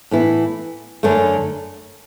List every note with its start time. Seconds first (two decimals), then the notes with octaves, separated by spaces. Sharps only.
0.11 A2 E3 B3 E4
1.03 F#2 D3 A3